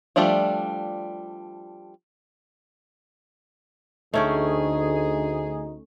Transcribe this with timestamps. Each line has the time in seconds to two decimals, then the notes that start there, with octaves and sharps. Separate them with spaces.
0.16 F3 G3 A3 D4 F4
4.14 D2 A3 C#4 D#4 G#4 G5